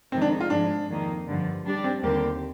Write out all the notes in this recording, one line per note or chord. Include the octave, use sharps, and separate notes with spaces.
F2 C3 D#3 G#3 C4 D#4
D4
F4
G#2 F3 G#3 D4
F2 D#3 A#3 D#4
G2 D3 F3
G3 D4 G4 D5
C4
D#2 D3 G3 A#3 C4 G4